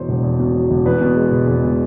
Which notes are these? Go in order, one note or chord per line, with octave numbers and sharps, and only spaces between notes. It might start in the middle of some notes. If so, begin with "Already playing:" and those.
Already playing: E2 B2 F#3 C5 C#5
E1
E2
B2
F#3
E1
E2 B4
B2
G#3
E1
E2
B2